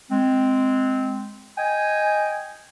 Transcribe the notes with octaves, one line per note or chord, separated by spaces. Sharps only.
G#3 C4
D#5 G5 G#5